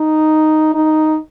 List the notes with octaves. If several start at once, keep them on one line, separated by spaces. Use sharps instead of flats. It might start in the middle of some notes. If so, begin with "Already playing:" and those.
Already playing: D#4
D#4